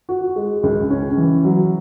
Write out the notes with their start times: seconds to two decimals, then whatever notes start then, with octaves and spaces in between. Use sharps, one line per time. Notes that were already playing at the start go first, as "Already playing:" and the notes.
0.09 F#4
0.36 G#3
0.63 C#2
0.90 C#4
1.17 E3
1.45 F#3